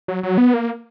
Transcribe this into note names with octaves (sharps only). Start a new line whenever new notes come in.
F#3
F#3
B3
A#3